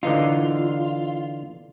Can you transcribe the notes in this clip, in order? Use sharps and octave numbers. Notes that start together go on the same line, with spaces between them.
D3 E3 D#4 F4